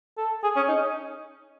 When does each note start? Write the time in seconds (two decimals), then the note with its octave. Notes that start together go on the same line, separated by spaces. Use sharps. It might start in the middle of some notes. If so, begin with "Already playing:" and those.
0.18 A4
0.44 G#4
0.56 C#4
0.69 D#4